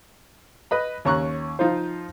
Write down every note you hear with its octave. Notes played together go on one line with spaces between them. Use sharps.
B4 D#5 B5
D#2 C#4 A#5 C#6 F#6
F3 D#4 F4 C5